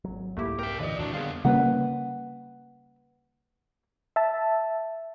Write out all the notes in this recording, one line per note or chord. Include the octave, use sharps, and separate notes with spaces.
G#1 F#3
C2 F2 G#2 A3 A#3 E4 G4
A#4 E5 G5
A#2 D3 E3 F4 B4 D5 D#5
F2 A2 D3 D#3 D4 F#4
G3 B3 G#4 F5 C6
C#3 G3 A#3 B4 F#5
E5 A5